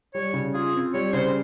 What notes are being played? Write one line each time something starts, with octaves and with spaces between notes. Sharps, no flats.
G3 C#5
C#3
F4 G#4
C4
G3 C#5
C#3 C5